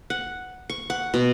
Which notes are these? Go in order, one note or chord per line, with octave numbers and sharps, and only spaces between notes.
F#5
C#6
F#5
B2